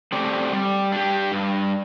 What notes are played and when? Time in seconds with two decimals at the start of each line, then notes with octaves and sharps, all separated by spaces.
0.12 A3 C4 G4 D5
0.53 G3
0.92 D4 G4
1.32 G2